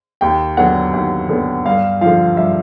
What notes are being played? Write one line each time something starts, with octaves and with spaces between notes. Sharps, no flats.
D#2 G5
D3 F#3 B3 F#5
D#2
D3 F#3 B3
G2 F5
D3 F3 F5
G2 E5